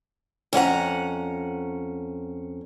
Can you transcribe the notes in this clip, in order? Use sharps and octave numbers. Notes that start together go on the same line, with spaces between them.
F2 C#4 F#5 A#5